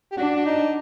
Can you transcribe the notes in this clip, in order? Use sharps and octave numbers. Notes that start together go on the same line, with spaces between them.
G4
D4 F#4
F#4
D#4